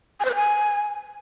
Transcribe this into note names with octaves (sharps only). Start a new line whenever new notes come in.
G#5
C5
B4
G#5